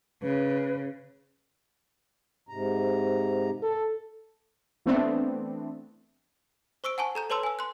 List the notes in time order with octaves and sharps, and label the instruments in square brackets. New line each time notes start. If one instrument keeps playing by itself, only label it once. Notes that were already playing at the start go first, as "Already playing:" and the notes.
[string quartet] C#3 [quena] B4
[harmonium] G#2 C3 A#5
[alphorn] A4
[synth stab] E3 A3 B3 C4 D4
[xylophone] C5 C#6 E6 D7
F#5 G#5 A5 C#6
A4 A#5 G6
A4 B4 C#5 A5 C6 E6
G#5 E6
C6 F#6